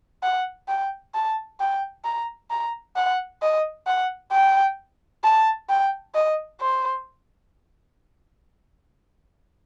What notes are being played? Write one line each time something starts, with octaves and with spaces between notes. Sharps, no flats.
F#5
G5
A5
G5
A#5
A#5
F#5
D#5
F#5
G5
A5
G5
D#5
C5